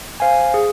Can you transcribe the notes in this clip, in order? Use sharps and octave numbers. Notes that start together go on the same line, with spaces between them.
C5 F5 G#5
G#4